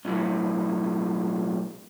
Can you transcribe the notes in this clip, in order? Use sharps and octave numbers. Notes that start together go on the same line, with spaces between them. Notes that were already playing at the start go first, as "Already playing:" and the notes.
B1 A2